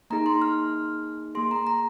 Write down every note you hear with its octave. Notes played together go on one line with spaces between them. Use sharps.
A#3 D#4 G#4 A#5
C6
F6
A#3 G#4 C6
A#5
A#5